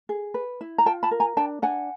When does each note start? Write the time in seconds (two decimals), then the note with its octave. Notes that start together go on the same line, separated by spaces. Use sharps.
0.09 G#4
0.34 B4
0.61 E4
0.78 A#5
0.86 F4 G5 A5
1.03 A5 B5
1.11 A#4
1.20 G#5 A#5
1.37 D4 G5 A5
1.62 D4 F#5 G#5